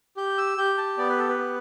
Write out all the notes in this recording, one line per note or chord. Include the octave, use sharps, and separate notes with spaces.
G4 G6
E6
G4 G6
A5
B3 D5
B4
A4
B4
B3